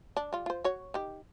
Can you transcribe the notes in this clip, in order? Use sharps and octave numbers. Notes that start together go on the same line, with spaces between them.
D4
G3 F4
F4 C5
F#4 C#5
D#3 G4